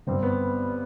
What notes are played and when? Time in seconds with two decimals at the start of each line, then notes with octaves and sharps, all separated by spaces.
0.07 G1 G2 D3 C4
0.23 B3